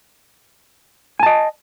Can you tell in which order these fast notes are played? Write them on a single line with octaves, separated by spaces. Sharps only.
G#5 A5 D#5